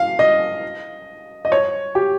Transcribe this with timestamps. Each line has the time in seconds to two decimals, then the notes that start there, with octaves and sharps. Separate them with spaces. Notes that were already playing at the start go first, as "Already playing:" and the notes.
Already playing: F5
0.19 D#5
1.45 D#5
1.52 C#5
1.95 G4